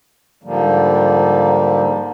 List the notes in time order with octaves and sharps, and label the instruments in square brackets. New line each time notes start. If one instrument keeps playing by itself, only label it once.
[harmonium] G#2 D3 F3 G3 A#3